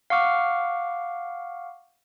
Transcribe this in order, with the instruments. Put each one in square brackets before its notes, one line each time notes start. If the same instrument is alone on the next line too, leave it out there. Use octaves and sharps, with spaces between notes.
[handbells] F5 F#5 C#6 D6 F6